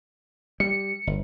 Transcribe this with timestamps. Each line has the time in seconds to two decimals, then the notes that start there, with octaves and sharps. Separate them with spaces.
0.60 G3 C#7
1.07 G1